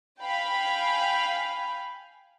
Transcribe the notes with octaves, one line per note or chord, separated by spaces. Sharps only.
F5 G5 G#5 B5